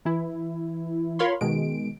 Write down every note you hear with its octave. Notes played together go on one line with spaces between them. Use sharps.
E3 E4
F4 A#4 C#5 F5 B5 C6
B2 D#3 G#3 D7